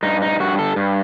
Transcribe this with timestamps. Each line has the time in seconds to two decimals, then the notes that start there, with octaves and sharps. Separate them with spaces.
0.03 G2 D#4
0.22 D#4
0.40 G2 F#4
0.59 A4
0.76 G2